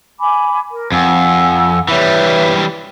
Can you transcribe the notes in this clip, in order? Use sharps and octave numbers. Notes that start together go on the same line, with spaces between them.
G#5 B5 D6
A#4
F2 F#5 G#5 E6
E3 G3 B4 C#5 E5